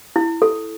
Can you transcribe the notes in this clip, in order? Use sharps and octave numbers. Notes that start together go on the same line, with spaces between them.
E4
A4